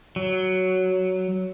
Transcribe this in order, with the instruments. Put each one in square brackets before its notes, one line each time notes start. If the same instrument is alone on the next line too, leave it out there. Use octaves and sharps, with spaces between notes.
[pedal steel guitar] F#3